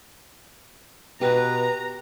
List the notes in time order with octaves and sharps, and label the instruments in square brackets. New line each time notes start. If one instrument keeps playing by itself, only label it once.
[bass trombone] B2 [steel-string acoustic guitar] G4 [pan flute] B4 [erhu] A#5